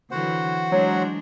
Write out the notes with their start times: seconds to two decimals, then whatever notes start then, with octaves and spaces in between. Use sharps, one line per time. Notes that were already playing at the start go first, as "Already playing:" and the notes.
0.11 D3 E3 F#3 F#4 C5 F#5
0.72 F#3 G#3 D4